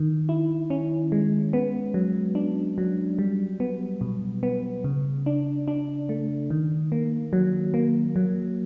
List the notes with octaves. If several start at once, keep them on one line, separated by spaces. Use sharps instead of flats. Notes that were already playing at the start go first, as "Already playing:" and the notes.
Already playing: D#3
E4
C#4
G#3
B3
F#3
D4
F#3
G3
B3
B2
B3
C#3
D4
D4
A3
D#3
A#3
F#3
A#3
F#3